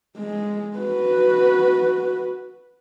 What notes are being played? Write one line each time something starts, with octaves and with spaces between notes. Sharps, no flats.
G#3
F#4 B4